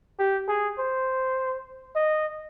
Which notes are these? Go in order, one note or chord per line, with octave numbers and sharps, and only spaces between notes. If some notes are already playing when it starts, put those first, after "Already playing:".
G4
G#4
C5
D#5